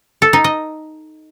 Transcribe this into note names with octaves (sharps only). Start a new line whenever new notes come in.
A4
D#4
D#5